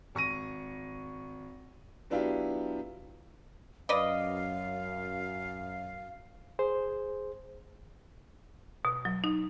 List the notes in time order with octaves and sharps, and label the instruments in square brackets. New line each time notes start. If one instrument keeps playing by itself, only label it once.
[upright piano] G#1 C#6 A#6 D#7
F#3 B3 D4 E4 F4 G4
[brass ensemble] F#2 [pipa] B4 D5 D#5 [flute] F5
[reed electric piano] G#4 C5
[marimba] B2
F#3
D#4